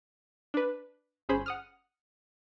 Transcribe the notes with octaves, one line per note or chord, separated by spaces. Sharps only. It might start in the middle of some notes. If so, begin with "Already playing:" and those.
D4 B4
G1 C#4 G#4 C5 B5
F#5 D#6 F6